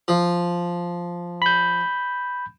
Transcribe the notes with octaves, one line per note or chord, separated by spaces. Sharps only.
F3
B5 G6